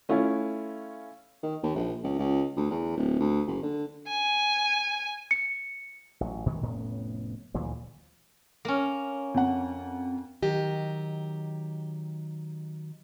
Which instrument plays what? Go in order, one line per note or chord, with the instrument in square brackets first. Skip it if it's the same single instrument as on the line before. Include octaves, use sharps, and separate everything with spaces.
[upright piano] A3 C#4 E4 F4
[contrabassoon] D#3
D#2
A#1
C#2
C#2
D2
E2
D1
D2
F#1
D3
[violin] G#5
[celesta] C#7
[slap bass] A1 F#3
B1 A#2 D#3 G#3
F1 A2 B3 C#4
D2 A#2 E3 F#3
[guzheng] A#3 C#4
[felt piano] F2 F#5
[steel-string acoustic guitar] D#3 F#3 G4 D#5